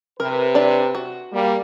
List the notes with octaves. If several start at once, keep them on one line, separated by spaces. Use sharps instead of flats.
C3 A#4 B4
D4 D5
F#4
G3 A#3